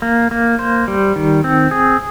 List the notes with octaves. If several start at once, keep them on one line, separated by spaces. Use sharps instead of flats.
A#3
A#3
C5
G3
D#3
C4
G#4